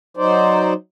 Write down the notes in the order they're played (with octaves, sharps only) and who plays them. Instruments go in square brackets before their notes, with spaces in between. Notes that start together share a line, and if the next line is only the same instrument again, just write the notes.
[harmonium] F#3 D#4 C5 D5